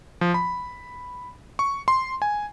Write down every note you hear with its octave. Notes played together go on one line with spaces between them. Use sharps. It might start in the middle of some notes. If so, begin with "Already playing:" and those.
F3
B5
C#6
C6
G#5